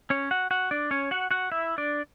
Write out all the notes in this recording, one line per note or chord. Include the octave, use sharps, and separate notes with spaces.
C#4 C#5
F#4 F#5
F#4 F#5
D4 D5
C#4 C#5
F#4 F#5
F#4 F#5
E4 E5
D4 D5